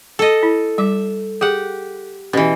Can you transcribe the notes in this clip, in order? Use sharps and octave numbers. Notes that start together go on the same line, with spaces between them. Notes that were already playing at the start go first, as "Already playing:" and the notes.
A4 D#5
E4
G3 E5 D6
G4 G#4 F#5
B2 E3 C#4 G4